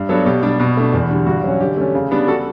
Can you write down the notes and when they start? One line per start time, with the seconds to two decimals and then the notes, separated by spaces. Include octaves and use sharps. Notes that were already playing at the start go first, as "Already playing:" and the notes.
Already playing: G2
0.09 F#3 B3 D4 A4 C#5
0.26 B2 G4
0.42 G3 D4
0.60 B2
0.77 A3 D4
0.93 E2
1.11 D3 G3
1.26 G2 F#4
1.44 F#3 C#4
1.60 D3 G4
1.77 A3 C#4
1.95 C#3
2.11 G3 B3 D4
2.28 F#4 A4